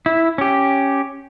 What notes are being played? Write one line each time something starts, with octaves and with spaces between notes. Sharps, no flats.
E4
C#4 G4